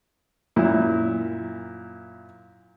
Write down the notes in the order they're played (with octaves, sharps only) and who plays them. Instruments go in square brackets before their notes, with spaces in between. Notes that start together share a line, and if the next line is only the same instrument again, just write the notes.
[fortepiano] F#2 A#2 E4